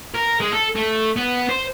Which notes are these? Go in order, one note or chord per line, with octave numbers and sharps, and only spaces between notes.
A#4
G#3
A4
A3
B3
C5